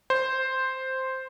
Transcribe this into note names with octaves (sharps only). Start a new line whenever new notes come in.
C5